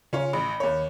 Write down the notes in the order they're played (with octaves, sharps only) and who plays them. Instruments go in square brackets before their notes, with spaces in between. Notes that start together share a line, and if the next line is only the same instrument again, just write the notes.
[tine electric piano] C#3 [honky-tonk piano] C#4 F4 C#5
[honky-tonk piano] A1 [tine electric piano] B5
[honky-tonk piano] D#2 C#5